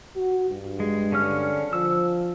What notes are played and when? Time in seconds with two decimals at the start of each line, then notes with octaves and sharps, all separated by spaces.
0.16 F#4
0.50 G2
0.80 G#3
1.12 D3 C#4 F6
1.73 F3 E6